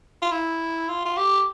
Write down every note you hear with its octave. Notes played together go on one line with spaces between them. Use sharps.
F4
E4
F4
F4
G4